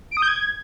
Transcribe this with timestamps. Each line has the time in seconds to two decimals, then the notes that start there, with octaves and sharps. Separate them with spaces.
0.11 D7
0.17 D#6
0.22 G6
0.28 G#6